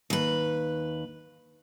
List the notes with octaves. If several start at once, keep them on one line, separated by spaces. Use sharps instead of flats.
D#2 B4